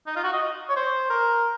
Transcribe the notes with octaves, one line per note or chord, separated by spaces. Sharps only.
D#4
F4
F#4
D#5
C#5
C5
A#4